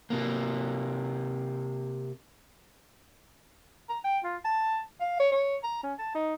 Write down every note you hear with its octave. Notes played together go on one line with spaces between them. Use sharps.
C3 A#3
A#5
G5
F4
A5
F5
C#5
C#5
A#5
C#4
A5
D#4